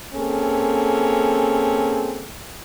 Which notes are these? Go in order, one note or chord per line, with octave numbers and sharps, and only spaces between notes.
A#3 C4 C#4 G#4 A4